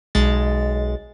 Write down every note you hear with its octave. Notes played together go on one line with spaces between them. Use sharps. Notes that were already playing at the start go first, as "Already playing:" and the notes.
B1 G#3 A6